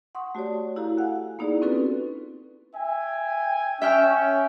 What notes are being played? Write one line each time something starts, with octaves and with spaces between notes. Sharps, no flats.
F#5 C6 C#6 D#6
A3 F#4 G4 C#5 D5
E4 F#4 G4 A4 F5 A#5
F5 F#5 G#5 F#6
A#3 B3 D#4 E4 G#4 D5
C4 C#4 F4 F#4 A4 B4
E5 G5 G#5
C#4 E5 G5 F6